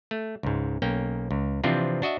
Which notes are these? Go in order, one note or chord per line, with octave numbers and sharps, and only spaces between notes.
A3
C#2 G#2
B1 A#3 C#4 G5
C#2
C3 E3 F3 C4 D4 F4
D4 F#4 D#5 E5